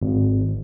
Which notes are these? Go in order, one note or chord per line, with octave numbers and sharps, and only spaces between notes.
G#1